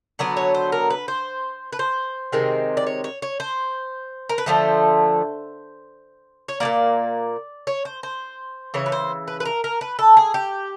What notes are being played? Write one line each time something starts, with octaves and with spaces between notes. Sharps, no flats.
D3 F#3 B3 D5
C#5
C5
A#4
B4
C5
B4
C5
C3 D#3 G#3 C4
D5
C#5
C#5
C#5
C5
A#4
B4
D3 F3 A3 C5
C#5
A#2 F3 A#3 D5
C#5
C5
C5
C#3 E3 C#5
B4
C5
B4
B4
A#4
A#4
B4
A4
G#4
G4